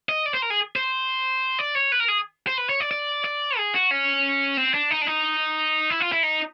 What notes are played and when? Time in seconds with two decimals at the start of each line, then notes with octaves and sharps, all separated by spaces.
0.09 D#5
0.26 D5
0.34 C5
0.42 A#4
0.50 G#4
0.76 C5
1.59 D5
1.75 C#5
1.92 B4
2.00 A#4
2.08 G#4
2.47 C5
2.58 B4
2.69 C#5
2.80 D5
2.91 D5
3.24 D5
3.57 G#4
3.74 F#4
3.91 C#4
4.57 C4
4.74 D4
4.91 D#4
5.02 D4
5.07 D#4
5.90 E4
6.00 F4
6.12 E4
6.23 D#4